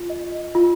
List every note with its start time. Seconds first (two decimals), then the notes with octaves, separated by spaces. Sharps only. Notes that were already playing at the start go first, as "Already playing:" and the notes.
Already playing: F4
0.10 D#5
0.55 F4